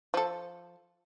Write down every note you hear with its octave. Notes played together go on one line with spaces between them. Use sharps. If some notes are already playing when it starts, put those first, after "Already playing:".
F3 A4